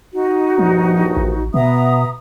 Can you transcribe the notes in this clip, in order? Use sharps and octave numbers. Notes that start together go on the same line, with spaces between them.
D#4 F#4
A#1 G2 F3
A1
B2 B3 E5 A#5 D#6